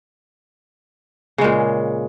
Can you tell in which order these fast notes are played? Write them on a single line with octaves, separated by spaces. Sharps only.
C#3 G#3 A#2